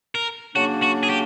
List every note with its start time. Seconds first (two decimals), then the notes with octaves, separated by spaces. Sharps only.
0.15 A#4
0.55 C#3 F#3 A#3 D4 F#4
0.82 F#4
1.03 G#4
1.10 G4